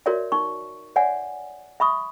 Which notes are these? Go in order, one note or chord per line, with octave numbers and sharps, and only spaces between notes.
F#4 A#4 C#5 D5 E5
D#4 C#6
C#5 D5 E5 F#5 G#5
E5 B5 C#6 D#6